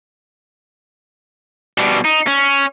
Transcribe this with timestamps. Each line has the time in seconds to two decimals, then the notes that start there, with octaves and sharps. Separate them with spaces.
1.79 B2 G3
2.05 D#4
2.27 C#4